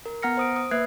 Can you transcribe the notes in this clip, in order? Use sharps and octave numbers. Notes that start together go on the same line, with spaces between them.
A#4
B3 F#5 A#5 F6 A#6 C#7
C5 D#6 D7
D#6
A#3 B4 E5 F#6 G#6 C7